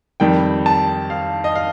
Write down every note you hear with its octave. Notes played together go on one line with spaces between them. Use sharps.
F2 D#3 G3 G5
A5
F5
D#5
F5